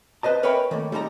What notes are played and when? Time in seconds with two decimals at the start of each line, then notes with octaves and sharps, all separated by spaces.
0.23 B4 C5 D#5 A5
0.43 A#4 B4 C#5 E5 G5 B5
0.71 D#3 A3 A#3
0.92 G3 G#3 D#4 A5 A#5